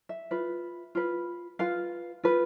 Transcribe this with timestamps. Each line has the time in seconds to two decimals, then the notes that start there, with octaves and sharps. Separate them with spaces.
0.09 E5
0.31 F4 B4
0.95 F4 B4
1.59 F4 B4 F5
2.24 F4 B4